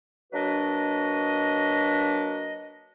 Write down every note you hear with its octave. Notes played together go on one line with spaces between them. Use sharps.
F#3 A#3 D4 F#4 B4 D#5